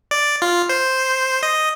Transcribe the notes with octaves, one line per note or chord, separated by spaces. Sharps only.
D5
F4
C5
D#5